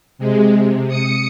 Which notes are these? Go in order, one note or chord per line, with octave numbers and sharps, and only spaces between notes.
C3 G#3
C3
D#6 C#7